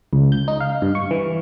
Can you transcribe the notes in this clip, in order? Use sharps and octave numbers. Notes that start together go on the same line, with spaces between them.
C#2
G6
D#4
F5
G2
C#6
E3